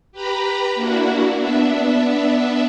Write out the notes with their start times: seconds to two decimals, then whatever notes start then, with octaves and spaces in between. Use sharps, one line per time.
0.12 G4 B4 A#5 B5
0.75 A#3 D4 E4 F#4
1.37 B3 D4 E5